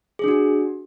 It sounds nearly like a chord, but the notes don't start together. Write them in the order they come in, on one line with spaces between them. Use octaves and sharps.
G#4 D4 F#4